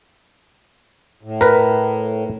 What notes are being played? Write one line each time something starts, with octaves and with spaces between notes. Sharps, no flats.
A2
A#4 B4